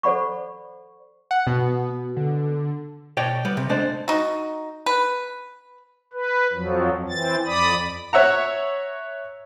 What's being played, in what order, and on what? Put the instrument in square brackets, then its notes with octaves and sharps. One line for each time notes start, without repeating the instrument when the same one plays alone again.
[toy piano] A4 C5 D5 F#5 B5 C#6
[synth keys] F#5
[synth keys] B2 [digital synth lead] B3
[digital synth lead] D3
[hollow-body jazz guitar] B2 C#5 D5 G5
G3 B3
C3
G#3 A3 B3 D4 C5 D5
[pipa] D#4 F#4
B4
[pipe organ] B4
F2 F3 F#3
E3 C4 A6
F2 D5 B5 D#6
[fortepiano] C#5 E5 F#5 A#5